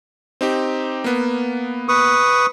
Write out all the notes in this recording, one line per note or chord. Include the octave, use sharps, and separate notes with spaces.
C4 D#4 G4
A#3 B3
B4 C#6 D#6